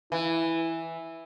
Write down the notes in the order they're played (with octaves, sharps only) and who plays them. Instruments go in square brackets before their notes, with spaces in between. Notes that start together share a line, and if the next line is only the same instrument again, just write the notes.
[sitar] E3 [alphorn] E4